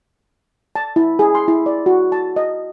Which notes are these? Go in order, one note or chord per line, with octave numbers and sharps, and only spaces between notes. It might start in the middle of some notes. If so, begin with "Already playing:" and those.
A5
E4
G#4
C6
E4
D5
F#4
A5
D#5